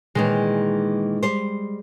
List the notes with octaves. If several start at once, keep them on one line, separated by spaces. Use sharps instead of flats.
A#2 D#3 E3 G#3
G3 C5